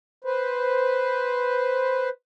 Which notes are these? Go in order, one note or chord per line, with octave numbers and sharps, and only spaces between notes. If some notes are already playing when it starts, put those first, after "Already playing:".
B4 C5